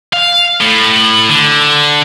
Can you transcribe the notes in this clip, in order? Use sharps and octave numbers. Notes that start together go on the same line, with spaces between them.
F5
A2
D3